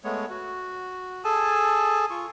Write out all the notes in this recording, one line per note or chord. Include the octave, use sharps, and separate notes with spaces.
G#3 A3 B3 C#5
F#4
G#4 A4 G#5 A5
F4 C#6